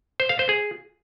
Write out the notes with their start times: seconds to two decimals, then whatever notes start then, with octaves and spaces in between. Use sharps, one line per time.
0.20 C5
0.29 F5
0.39 C5
0.49 G#4